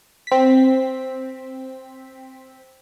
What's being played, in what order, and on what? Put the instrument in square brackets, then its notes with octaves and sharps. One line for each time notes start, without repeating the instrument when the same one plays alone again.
[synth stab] C4 B6